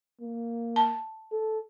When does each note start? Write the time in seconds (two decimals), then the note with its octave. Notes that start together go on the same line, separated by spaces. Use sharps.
0.21 A#3
0.76 A5
1.32 A4